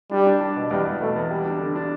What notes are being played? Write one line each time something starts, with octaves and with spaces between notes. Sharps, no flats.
G3 D4
D4
D4
B2
E2 G3
E2
B2 A3
E2
G3
D4
D3
D4